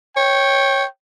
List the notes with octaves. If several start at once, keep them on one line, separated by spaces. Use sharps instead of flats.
C#5 G5